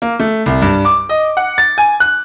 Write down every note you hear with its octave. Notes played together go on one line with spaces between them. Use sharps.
A#3
A3
C2
G2
D6
D#5
F#5
A6
G#5
F#6